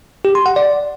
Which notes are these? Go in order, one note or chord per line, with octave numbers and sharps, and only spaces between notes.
G4
C6
F#5
D5